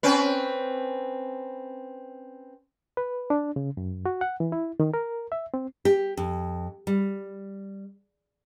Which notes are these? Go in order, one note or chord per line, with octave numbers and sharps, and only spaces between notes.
C4 C#4 B4
B4
D4
C#3
F#2
F#4
F#5
E3
E4
D#3
A#4
E5
C4
G4
F2
G3